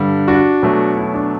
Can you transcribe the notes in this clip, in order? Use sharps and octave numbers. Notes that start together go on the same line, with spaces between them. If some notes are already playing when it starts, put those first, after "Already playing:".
Already playing: G2 D3 G3
D4 F#4
B2 F#3 A3
C#4 E4
D4